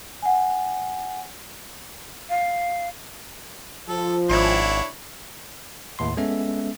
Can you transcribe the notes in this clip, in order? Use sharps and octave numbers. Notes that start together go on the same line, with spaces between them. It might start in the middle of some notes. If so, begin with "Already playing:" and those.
F#5 G#5
F5
F3 A4
G#1 D4 E4 C#5
D#2 A2 C6
G#3 B3 C#4 A4 E5